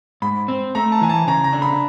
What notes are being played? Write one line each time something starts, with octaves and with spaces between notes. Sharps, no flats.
G#2 B5
C4
A3 A#5
A5
E3 G#5
A5
C#3 A#5
A#5
D4
B5